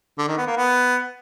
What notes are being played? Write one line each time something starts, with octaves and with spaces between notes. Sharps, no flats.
D3
D#3
B3
A#3
B3